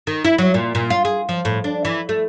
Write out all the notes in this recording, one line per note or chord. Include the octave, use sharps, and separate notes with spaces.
D#3
E4
F#3
A#2
A#2
F4
G#4
F3
A2
D4
E3
A3